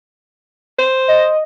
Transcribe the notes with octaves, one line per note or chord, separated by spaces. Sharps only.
C5
D#5